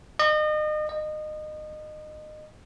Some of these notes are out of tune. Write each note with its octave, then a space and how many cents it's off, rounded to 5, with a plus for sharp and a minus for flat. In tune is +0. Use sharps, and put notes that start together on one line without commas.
D#5 -35
D#5 -25